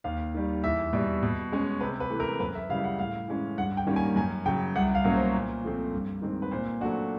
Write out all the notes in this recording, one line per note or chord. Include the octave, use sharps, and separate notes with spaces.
D#2 F5
D#3 G3
E2 E5
B2 G3
B2
G#3 C#4
C3 B4
B4
E3 A3
A#4
F#2 B4
E5
C#3 E3 G3 F5
F#5
A2 F5
E3 G#3 C#4
G2 F#5
G5
D#3 G3 A#3 C#4
G#5
F#2 G#5
C#3 F#3 G5
C2 F#5
F5
B2 F#3 A#3 C#4
C5
A#2
F3 A3 C4
G2
D#3 G#3 C4
B4
A#2 C5
F#3 A3 D4 F#4